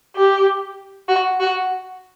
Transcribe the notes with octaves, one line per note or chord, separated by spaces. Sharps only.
G4
F#4
F#4